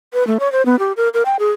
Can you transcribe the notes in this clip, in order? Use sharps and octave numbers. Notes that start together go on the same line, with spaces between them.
B4
A3
C#5
C5
B3
G4
A#4
A#4
G5
G#4